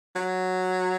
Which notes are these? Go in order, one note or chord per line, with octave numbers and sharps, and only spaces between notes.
F#3